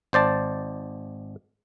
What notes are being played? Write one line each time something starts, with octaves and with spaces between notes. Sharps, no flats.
G#1 C5 D5 A5